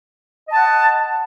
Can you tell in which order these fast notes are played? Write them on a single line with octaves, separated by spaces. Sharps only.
D#5 A5 F#5